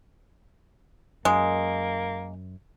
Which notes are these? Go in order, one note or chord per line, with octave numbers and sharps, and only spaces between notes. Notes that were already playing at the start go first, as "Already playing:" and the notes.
F#2 G#3 A#3